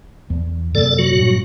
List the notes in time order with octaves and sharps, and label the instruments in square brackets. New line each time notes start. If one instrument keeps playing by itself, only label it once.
[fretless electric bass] E2
[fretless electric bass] F#2 C3 A#3 [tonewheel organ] A4 D5
[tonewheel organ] F#3 F#4
[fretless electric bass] G2 A#2